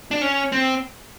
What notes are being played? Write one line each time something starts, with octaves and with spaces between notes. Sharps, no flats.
D4
C#4
C4